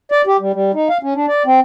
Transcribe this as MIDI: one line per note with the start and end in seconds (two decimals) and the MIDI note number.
0.12 0.22 74
0.27 0.37 67
0.40 0.52 55
0.53 0.71 55
0.74 0.88 63
0.89 0.98 77
1.03 1.14 61
1.15 1.26 62
1.28 1.43 74
1.46 1.60 60